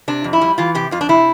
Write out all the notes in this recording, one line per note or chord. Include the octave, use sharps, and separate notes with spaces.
C3 D4
F2
E4
G3
E3 F4
C3 G4
F2 F4
D4
C3 E4